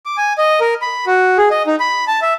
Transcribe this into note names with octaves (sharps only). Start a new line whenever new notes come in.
D6
G#5
D#5
A#4
B5
F#4
G#4
D#5
D#4
B5
A5
E5